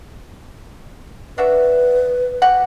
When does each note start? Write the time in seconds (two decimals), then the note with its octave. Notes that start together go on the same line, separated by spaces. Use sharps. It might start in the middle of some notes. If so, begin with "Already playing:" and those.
1.38 D4 F#4 B4 E5
2.42 F#4 G4 F#5